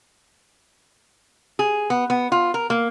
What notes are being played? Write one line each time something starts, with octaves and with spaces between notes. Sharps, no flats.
G#4
B3
B3
F4
A#4
A#3